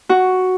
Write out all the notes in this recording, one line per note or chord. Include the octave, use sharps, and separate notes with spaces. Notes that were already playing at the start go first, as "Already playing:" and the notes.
F#4